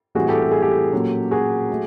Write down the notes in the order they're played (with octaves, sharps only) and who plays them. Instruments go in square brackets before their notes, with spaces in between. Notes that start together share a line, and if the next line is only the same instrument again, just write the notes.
[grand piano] A2 E3 G3 C4 E4 [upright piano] F#4 G#4
[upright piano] G4 A4
A4
G#4
G4 A4
[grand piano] A#2 F#3 A#3 C#4
[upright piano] F#4 G#4
[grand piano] F#3 A3